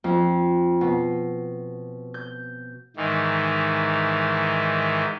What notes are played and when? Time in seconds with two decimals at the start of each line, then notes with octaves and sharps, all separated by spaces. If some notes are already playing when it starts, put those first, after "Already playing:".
0.04 F2
0.81 B2
2.14 G6
2.97 G#2 D#3 E3